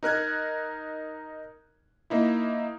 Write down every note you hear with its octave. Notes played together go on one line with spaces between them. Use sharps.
D#4 A#4 F#6 G#6
A#3 D#4 E4